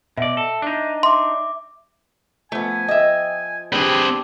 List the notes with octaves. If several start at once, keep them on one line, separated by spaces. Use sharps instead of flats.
B2 D5 E5
A4
D4 D#4
E5 C6 D6
F3 A3 B3 G#5
D#5 E5 G5 D#6
G3 C4 D4 G4 G#4 B4